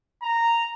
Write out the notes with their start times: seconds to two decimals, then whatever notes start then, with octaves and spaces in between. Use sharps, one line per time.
0.22 A#5